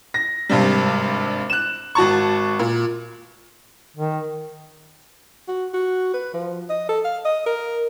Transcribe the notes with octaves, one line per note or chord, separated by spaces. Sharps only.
A#6
G#1 G2 C3 G3
F#6 E7
G#1 F#4 A5 C#6
A#2
D#3
F#4
F#4
B4
F3
D#5
A4
F5
D#5
A#4